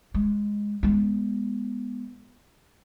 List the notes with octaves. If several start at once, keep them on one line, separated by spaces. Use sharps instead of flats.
G#3
G#3 B3